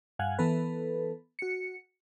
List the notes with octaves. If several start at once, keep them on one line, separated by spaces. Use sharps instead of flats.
G2 F5 F#5 G#5
E3 B3 A4 B4
F#4 C#7